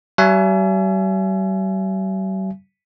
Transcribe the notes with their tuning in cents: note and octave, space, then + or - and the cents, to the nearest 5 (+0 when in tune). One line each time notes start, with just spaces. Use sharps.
G3 -45 E5 +35 G#5 +30